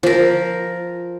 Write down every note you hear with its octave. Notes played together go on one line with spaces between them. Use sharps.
F3 A#4